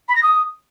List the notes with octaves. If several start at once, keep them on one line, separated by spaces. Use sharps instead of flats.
B5
A#6
D#6